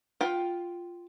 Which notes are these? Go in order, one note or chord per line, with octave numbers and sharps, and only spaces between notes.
F4 G5